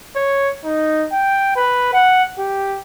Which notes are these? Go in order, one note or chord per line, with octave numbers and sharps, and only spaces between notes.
C#5
D#4
G5
B4
F#5
G4